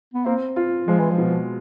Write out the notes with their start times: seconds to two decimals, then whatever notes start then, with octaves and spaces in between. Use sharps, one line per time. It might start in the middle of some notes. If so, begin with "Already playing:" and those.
0.14 B3
0.26 A#3 C4
0.56 F4
0.87 F3 G#3
1.00 E3
1.11 F3
1.18 B2